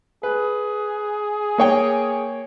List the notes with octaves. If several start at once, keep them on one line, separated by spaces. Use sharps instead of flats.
G#4 B4
A#3 C#5 G5